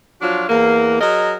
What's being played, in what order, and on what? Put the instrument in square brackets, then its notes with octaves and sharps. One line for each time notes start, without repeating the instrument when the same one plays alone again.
[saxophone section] F3 F#3 D4 F4 F#4
E2 A#3
F#3 G#4 A#4 D#5